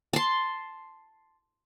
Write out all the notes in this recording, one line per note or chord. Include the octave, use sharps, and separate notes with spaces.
A5 C6